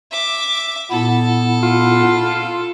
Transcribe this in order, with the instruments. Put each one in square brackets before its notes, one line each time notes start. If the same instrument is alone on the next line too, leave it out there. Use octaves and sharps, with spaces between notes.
[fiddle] E5 D6
[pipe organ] A#2 B3 E4 [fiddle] A4
[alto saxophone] F4